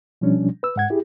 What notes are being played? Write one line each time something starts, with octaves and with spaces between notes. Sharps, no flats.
B2 F3 G3 C#4 D4
B4 E6
G#2 F#5 G#6
E4 G4 G#4